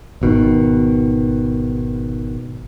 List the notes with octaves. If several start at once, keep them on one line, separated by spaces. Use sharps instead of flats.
G#1 B2 D#3